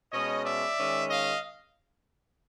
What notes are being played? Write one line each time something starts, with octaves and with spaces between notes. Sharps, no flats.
B2 G#3 C#4 C#5 D#5
D5 E5
D#3 G#3 C#4
D#5 F5